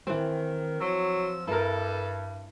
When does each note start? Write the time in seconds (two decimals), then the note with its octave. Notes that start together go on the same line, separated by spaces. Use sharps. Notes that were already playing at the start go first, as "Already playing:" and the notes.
0.07 D#3 E3 C4
0.81 F3 F#3 E6
1.48 G2 E4 A4 A#4